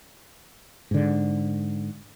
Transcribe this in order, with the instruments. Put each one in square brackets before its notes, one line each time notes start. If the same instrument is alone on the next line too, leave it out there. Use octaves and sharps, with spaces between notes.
[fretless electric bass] G#2 D3